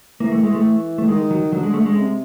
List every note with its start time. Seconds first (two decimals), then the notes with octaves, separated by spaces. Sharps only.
0.20 E3 A#3
0.32 A3
0.43 G#3
0.54 A3
0.98 A3
1.08 D#3 G#3
1.31 F#3
1.52 D3 F#3
1.63 G#3
1.74 A3
1.86 G#3
1.96 C3